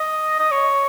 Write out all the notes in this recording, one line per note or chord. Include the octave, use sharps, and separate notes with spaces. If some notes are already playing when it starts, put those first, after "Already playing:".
Already playing: D#5
D#5
C#5